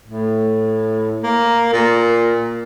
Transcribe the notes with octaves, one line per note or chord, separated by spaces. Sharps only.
A2
A#3
A#2